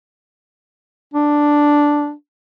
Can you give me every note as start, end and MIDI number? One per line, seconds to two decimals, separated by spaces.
1.14 2.12 62